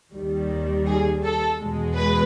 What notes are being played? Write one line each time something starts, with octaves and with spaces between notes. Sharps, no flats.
D#2 D#3 G3
G#4
A4
E2 B2 G#3
B4